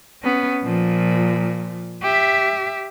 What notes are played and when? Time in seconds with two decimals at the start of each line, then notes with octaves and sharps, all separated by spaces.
0.23 B3 C#4
0.64 A#2 F3
2.03 G4 E5